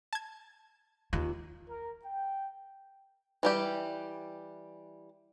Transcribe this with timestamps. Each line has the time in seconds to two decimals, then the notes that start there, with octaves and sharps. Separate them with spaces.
0.13 A5 G#6
1.13 D#2 F4
1.69 A#4
2.05 G5
3.43 E3 G3 G4